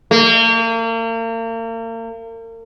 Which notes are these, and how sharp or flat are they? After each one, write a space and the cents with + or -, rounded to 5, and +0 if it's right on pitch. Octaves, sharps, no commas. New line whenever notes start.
A#3 -40